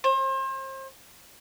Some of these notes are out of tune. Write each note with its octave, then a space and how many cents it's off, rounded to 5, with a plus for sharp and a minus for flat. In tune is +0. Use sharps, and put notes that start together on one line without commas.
C5 +35